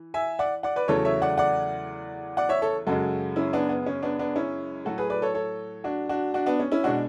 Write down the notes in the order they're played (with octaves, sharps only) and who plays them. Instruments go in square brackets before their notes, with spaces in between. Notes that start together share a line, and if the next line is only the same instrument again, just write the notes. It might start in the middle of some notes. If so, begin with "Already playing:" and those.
Already playing: [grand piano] E3
E5 G#5
D5 F#5
D5 F#5
B4 D5
E2 C#3 F#3 A3 A4 C#5
C#5 E5
D5 F#5
D5 F#5
D5 F#5
C#5 E5
A4 C#5
F#2 C#3 G#3 F#4 A4
C#4 E4
B3 D4
B3
C#4
B3 D4
B3 D4
C#4 E4
A2 F#3 A3 F#4 A4
G#4 B4
B4 D5
A4 C#5
A4 C#5
D4 F#4
D4 F#4
D4 F#4
B3 D4
C#4
C#4 E4
B2 G#3 D4 F#4